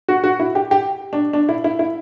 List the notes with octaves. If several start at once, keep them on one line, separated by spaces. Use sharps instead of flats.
F#4
F#4
E4
G4
G4
D4
D4
E4
E4
E4